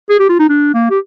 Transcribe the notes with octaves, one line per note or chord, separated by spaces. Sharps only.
G#4
G4
F4
D#4
D4
A#3
G4